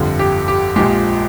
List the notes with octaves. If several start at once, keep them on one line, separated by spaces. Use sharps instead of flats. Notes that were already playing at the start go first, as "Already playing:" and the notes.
Already playing: G1 F2 D3 G3
G4
G4
A#1 A#2 F3 G#3 G4